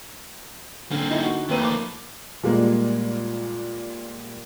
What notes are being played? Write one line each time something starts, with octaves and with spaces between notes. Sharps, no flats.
D3 A#3 C4 C#4
D#4 E4
F#4
D#3 A3 A#3 C4 B4 C#5 D#7
F3 B5 D6
A#2 G3 G#3 A#3